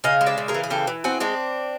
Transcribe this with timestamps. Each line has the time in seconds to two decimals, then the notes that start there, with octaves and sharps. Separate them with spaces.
0.04 C#3 D#5 F5
0.21 G#3
0.26 D5 E5
0.38 C#3
0.48 G#4 A#4
0.54 E3
0.63 G#4
0.70 C#3 G4 A4
0.87 E3
1.04 C4 F#4 G#4
1.20 G#3 C4 D4